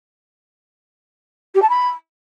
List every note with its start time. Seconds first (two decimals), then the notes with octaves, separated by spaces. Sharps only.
1.54 G4
1.62 A5
1.69 B5